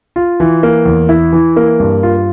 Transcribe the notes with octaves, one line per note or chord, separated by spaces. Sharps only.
F4
E3
A#3
E2
E4
E3
A#3
G2
F4